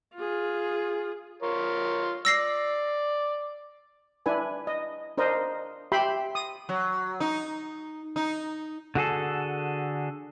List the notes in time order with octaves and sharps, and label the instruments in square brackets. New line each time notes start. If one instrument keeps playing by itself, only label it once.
[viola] F4 G#4
[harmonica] F4 A#4 C#5
[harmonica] D5 [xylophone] E6 A#6 C7
[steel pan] D4 E4 B4 G#5
D#5
D4 A#4 C5 D#5
G4 E5 G5 B5 C6
D#6
[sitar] F#3
D#4
D#4
[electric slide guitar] D3 F#4 G#4 A4